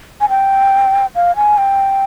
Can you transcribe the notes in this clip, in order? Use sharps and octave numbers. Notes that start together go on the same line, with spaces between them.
G#5
G5
F5
G#5
G5